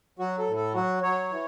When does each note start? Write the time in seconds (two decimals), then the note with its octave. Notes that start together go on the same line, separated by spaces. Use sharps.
0.19 F#3 F#4
0.38 A4
0.47 A2
0.56 A4
0.74 F#3 F#4
1.02 F#3 C#5
1.31 E3